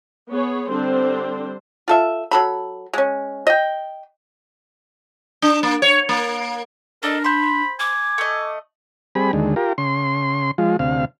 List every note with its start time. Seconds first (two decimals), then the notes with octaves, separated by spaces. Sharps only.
0.29 B3 G#4 C#5
0.69 D3 G3 C4 D4 C5
1.88 F4 A4 E5
2.31 F#3 A4 B5
2.94 G#3 C#4
3.47 D#5 G5
5.42 D4
5.63 A#3
5.82 C#5
6.09 A#3
7.03 D4 A4 A#4 D5 D#5
7.24 C5 B5 C6
7.80 G#5 D6
8.18 A3 D#5
9.15 G3 C4 G#4 B5
9.33 D#2 D3 G#3
9.56 F4 G4 A#4
9.78 C#3 C6
10.58 F3 G#3 F4
10.79 D2 C3 F5